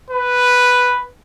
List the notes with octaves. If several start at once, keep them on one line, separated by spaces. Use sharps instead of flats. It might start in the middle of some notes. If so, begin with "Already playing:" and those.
B4